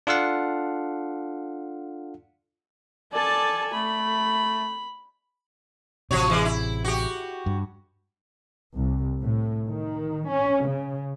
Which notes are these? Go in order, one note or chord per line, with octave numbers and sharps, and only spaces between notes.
D4 F4 A4 F5 F#5
A4 D5 G#5 A5
A3 B5
A1 C3 F3 F#4 C#5
E3 G#3
E4
F#4 G4
G2
C2
A2
D#3
C#4
C#3